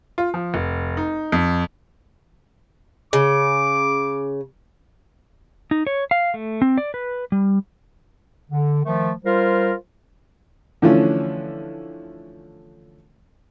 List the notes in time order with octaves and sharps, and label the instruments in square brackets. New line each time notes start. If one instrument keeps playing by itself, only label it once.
[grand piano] F4
F3
F1
D#4
F2
[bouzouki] C#3 [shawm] D6
[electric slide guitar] D#4
C#5
F5
A3
C4
D5
B4
G3
[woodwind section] D3
D#3 F3 A3
G3 F4 A#4 C5
[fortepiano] D3 E3 F3 A3 C#4